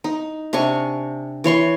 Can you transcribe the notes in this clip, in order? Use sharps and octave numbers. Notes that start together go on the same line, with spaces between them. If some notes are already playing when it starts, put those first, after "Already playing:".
D#4
C3 D4 G#5 C#6
E3 C#5 C6 C#6